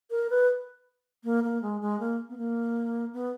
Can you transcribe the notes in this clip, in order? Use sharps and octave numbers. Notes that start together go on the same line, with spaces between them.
A#4
B4
A#3
A#3
G#3
G#3
A#3
B3
A#3
B3